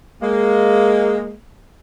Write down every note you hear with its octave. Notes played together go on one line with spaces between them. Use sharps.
G#3 A#3